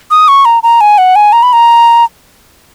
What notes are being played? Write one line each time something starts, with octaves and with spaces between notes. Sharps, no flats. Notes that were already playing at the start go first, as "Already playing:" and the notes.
D#6
C#6
A#5
A#5
G#5
F#5
G#5
A#5
B5
A#5